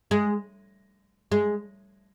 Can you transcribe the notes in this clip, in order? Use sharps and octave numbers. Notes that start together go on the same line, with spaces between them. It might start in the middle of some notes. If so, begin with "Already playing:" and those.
G#3
G#3